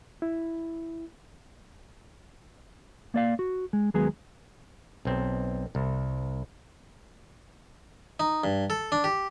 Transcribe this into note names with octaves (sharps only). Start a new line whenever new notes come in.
E4
A#3 D5 F5
F#4
G#3
D#2 F#3 G#3 B3 G#4
B1 C4
C2
D#4
G2
A4
D4
G4